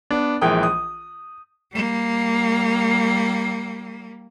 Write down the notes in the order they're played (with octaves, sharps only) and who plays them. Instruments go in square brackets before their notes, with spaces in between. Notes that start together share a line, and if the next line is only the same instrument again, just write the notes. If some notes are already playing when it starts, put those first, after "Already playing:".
[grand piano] B3 D4
A#1 E3 G#3 A#4 G5 D#6
D#6
[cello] G3 A#3